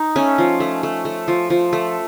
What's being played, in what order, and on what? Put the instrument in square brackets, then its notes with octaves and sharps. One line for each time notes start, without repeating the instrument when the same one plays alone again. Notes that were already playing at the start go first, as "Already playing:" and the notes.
Already playing: [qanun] D#4
A3 C#4
F3
A3
A3
A3
F3
F3
A3